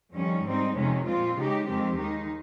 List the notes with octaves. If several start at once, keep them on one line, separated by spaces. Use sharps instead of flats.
F2 D#3 G3 C#4
G#2 G3 C4 D#4
F2 C3 D#3 G#3 C#4
A#2 G#3 C4 F4
C#3 G#3 D#4 G4
F2 D#3 G#3 C4 G4
D#2 D#3 G#3 D#4